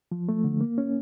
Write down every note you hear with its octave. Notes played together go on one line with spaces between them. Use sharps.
F3
A3
D3
A#3
C#4